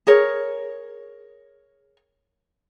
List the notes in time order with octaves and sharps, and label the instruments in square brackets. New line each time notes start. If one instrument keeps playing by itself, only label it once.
[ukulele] G#4 A#4 C#5